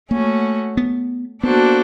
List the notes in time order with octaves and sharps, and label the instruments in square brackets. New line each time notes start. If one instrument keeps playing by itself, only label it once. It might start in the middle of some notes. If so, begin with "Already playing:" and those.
[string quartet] A3 C#4 F#4 [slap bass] A#3
[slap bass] B3
[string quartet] A#3 D4 F#4 A4 C5 [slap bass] B3